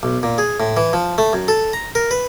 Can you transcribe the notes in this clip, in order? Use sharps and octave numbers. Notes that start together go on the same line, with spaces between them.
B1
A#2
G#4
A2
E3
F3
A3
F#2
A4
A#5
A#4
B4